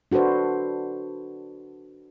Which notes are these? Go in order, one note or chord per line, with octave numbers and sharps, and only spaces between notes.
D4 F#4 A4 B4 C5